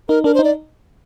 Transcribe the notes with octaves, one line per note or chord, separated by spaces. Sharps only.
D#4 A#4
D4 A#4
C5
D#4
D5